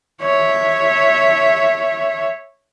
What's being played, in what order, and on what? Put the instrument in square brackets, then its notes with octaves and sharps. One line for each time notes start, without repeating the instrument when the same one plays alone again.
[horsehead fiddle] C#5 E5